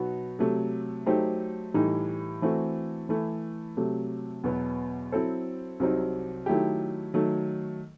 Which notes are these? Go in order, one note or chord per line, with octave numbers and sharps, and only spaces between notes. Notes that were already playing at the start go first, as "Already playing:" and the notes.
Already playing: B2 F#3 B3 D#4 F#4
C3 F#3 A3
F#3 A3 D#4 G4 C5
A2 E3 G3 D#4
E3 A3 C4 F#4
E3 A3 E4
C3 F#3 A3
E2 B2 F#3 B3
F#3 C4 E4 A4 C5
C2 C3 F#3 C4 D#4
D#3 F#3 A3 E4 G4
D#3 F#3 A3